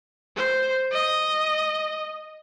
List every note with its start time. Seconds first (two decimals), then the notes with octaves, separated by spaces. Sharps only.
0.37 C5
0.92 D#5